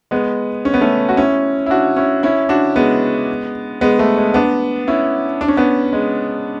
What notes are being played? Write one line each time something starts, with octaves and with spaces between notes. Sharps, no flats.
G#3 B3
C#4
B3
A3 C#4
F#4
C#4 E4
E4
D4 F#4
C#4 E4
C#4 E4
D4 F#4
G#3 B3
G#3 B3
A3
G#3
B3 D4
C#4 E4
D4
C#4
B3 D4
G#3